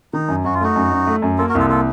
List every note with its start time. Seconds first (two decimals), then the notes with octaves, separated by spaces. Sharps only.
0.13 D#3 D#4
0.29 F#2
0.45 F#2 F#4
0.54 F4
0.61 A3 D#4 F#4
0.76 F#2
0.92 F#2
1.07 A3
1.22 F#2
1.38 A#3 F4 A4
1.49 F#4 A#4
1.55 C2 F4 A4
1.70 A#3 F4 A4